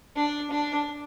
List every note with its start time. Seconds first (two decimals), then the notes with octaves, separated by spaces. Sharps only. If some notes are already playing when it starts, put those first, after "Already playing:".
0.16 D4
0.51 D4